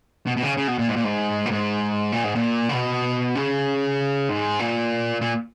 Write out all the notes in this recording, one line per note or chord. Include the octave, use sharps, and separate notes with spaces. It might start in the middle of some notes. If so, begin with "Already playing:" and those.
B2
B2
C#3
C#3
B2
A#2
G#2
A#2
G#2
A#2
G#2
A#2
G#2
A#2
C#3
B2
C#3
G#2
A#2
A#2